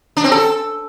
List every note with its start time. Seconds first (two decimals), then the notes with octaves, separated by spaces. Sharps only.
0.17 D4
0.24 C4
0.32 A4